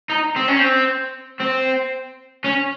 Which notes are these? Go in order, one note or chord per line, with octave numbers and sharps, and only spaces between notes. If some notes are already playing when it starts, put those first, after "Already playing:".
D#4
C4
C#4
C4
C4
C#4